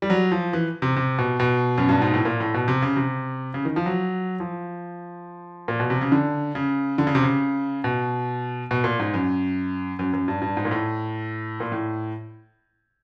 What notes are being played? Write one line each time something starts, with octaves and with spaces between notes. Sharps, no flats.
G3
F#3
F3
E3
C3
C3
B2
B2
F#2
G2
G#2
A2
A#2
A2
B2
C3
C#3
C3
C#3
D#3
F3
F#3
F3
A#2
B2
C3
C#3
D3
C#3
D3
C#3
C3
C#3
B2
B2
A#2
G#2
F#2
F#2
F#2
G2
G2
G#2
A#2
A2
A#2
A2